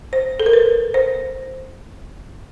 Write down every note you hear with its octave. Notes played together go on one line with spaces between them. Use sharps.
C5
A4
A#4
B4
C5